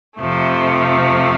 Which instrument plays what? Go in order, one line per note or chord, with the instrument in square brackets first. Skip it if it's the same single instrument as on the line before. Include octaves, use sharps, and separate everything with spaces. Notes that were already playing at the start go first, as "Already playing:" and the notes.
[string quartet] F2 C3 F3 A3